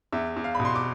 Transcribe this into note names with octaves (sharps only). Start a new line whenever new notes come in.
E2 E5
E2
F5
B5
B2
C6
D6